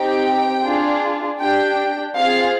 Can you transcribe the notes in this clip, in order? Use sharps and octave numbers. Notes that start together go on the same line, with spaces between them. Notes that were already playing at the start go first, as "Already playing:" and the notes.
Already playing: C4 D#4 G4 G5
D4 F4 G#4
D4 G4 G5
C4 F4 G#4 F5